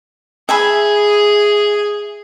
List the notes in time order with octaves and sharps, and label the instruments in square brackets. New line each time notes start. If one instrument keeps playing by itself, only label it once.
[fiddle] G#4 [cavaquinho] E5 G#5 B5